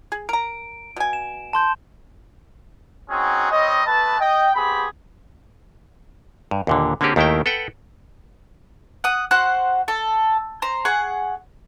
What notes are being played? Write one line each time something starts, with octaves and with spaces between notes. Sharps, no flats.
G#4
A#4 A#5 D7
B2 G#5
E7
A5 C6 G6
C4 C#4 D#4 F#4 G#4
G3 C4 C#5 D#5
A3 B3 B4 A5
D#5 G5
B3 C4 G4 G#4 B5
G2
D#2 A#2 D3
D3 A#3 C4 C#4 G4 G#4
D#2 D#3 A3 E4 A#4 G5
A4 B4 F#5 G5
F#5 D#6
F#4 C5 F#5 F#6
A4
C5 A#5
G#4 F#5 C#6